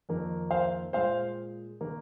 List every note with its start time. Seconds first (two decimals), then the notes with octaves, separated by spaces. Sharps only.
0.09 F2 D#3 A#3
0.51 C5 F5
0.93 A#2 G#3 C5 F5
1.81 D#3 A#3